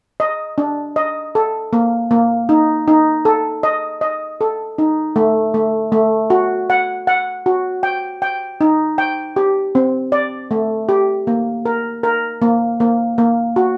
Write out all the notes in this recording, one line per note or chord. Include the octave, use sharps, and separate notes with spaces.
D#5
D4
D#5
A4
A#3
A#3
D#4
D#4
A4
D#5
D#5
A4
D#4
A3
A3
A3
F#4
F#5
F#5
F#4
G5
G5
D#4
G5
G4
C4
D5
A3
G4
A#3
A#4
A#4
A#3
A#3
A#3
F#4